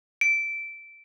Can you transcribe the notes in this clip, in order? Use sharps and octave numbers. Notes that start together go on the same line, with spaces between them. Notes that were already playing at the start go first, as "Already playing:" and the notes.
D7